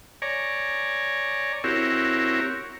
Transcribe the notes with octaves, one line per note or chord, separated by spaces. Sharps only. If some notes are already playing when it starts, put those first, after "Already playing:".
C#5 D5 G#5 A#5
C4 E4 F#4 G4 A#4 C#5